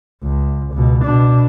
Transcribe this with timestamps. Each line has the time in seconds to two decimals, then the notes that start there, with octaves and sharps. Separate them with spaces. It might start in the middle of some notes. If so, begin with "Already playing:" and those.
0.23 C#2
0.74 C#2 B2
1.04 B2 D4